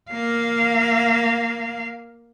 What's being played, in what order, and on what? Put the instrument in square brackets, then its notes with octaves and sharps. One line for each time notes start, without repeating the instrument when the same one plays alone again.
[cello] A#3 F5